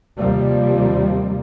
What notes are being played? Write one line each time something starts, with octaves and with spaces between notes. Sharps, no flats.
D#2 C3 F3 G3 A#3